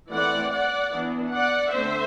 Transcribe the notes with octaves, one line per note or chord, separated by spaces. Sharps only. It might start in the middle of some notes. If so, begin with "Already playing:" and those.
E3 A3 C4 D5 F#5
D5 F#5
E3 B3 D4
D5 F#5
D3 A3 C4 C5 E5